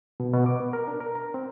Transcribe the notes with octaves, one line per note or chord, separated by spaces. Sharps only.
B2
B2
D6
B3
A#4
D4
A#4
A#5
C4